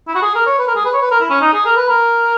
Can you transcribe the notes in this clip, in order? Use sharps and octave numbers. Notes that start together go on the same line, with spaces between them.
E4
F#4
G#4
A#4
C#5
B4
A#4
G#4
B4
C#5
B4
A#4
E4
C#4
D#4
G#4
A#4
B4
A#4